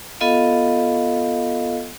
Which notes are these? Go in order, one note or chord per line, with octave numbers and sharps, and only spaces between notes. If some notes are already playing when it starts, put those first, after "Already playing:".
B3 F4 A4 D#5 F5